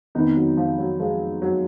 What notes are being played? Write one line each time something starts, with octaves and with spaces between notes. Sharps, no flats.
F2 D#3 B3 D#4
F#3
F3
F#3
F3 G#3
F#3